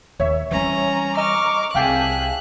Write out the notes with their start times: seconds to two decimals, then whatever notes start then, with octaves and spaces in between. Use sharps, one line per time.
0.20 D#2 C#5 E5
0.51 E3 G3 C#4 A#5
1.17 D#5 A#5 C#6 D6 F6
1.75 C2 G#4 E5 F5 G5 A5 F#6